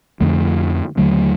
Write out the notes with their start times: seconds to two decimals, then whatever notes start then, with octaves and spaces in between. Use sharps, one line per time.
0.21 F2 D3 F3 A3
0.97 D#2 D3 F#3 A3